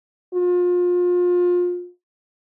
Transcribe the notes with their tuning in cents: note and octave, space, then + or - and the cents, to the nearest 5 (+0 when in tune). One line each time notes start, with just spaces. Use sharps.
F4 +30